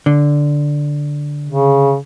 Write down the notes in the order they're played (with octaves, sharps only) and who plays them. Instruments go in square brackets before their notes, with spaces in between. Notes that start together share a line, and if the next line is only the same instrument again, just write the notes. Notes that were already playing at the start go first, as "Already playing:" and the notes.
[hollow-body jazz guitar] D3
[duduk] C#3